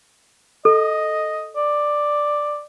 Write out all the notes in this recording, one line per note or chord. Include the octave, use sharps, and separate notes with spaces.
A4 D#5
D5